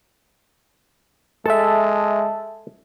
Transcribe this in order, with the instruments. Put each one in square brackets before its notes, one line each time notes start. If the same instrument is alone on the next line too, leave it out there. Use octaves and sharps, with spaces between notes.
[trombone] G#3 [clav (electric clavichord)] A4 [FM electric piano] E5 A5